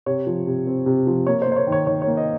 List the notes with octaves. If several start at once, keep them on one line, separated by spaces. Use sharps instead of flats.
C3 C#5
F3
C3
C4
C3
F3
A#3 C#5
C5
A#3
C5
C#5
D#3
C#5
D#3 C#5
C#5
A#3
D#5